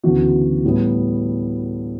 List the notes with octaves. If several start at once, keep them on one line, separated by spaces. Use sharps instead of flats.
D2 C#3 E3 B3 F#4
A2 G3 B3